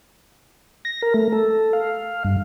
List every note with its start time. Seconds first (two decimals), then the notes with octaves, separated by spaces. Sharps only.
0.85 A#6
1.02 A#4
1.14 A3
1.32 A4
1.73 F5
2.25 G2